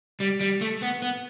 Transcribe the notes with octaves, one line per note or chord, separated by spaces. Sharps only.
G3
G3
A3
B3
B3